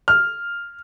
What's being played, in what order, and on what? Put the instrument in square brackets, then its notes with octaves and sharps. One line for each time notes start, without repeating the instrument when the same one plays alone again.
[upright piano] F6